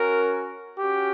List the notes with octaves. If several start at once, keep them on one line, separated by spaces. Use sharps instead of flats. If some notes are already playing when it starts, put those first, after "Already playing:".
Already playing: C#4 F#4 A#4
C#4 F#4 G4